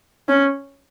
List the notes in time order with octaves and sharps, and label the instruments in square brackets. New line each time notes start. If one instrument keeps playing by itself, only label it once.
[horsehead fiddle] C#4